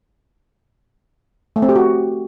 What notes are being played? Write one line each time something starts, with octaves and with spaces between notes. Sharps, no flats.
A3
C4
G4
F#4